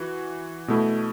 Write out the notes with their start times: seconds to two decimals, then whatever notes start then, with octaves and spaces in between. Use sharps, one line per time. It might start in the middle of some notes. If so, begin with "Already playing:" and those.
Already playing: E3 F#4
0.68 B2 A3 E4